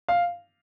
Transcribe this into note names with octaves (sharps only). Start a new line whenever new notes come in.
F5